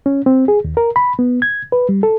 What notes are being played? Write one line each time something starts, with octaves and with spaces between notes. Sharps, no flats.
C#4
C4
G#4
D#2
A#4
B5
B3
G#6
B4
G3
A4